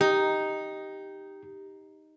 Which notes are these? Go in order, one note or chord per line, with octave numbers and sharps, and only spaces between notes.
D#4 G4